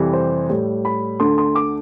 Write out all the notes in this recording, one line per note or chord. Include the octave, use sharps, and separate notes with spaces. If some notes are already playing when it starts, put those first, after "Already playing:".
Already playing: F2 C3 E3 G3
C5
A2 G3
B5
D2 D3 A3 C6
C6
D6